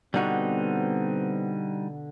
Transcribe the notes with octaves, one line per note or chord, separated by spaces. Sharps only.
B2 D3 G3 B3 C4 D#4 F#4